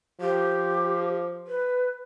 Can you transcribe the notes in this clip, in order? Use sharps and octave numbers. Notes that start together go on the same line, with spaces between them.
F3 G4
B4